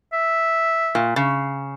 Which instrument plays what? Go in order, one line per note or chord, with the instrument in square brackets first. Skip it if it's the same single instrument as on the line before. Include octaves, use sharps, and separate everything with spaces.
[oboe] E5
[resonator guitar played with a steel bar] A#2
C#3